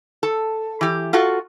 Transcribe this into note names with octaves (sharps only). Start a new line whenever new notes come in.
A4
E3 G4
F4 F#4 A4